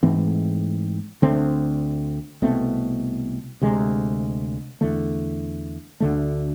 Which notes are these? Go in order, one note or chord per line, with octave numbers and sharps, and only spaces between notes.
G#2 E3 A3 C4
D2 D3 A3 C4
C2 B2 A3 C4
D2 C3 G#3
E2 D3 A3
D2 D3 A3